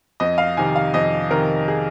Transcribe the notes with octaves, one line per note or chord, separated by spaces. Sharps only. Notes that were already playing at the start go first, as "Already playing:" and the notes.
F2 D#5
F5
C3 D#3 G#5
F5
F2 D#5
C3 D#3 A#4
G#4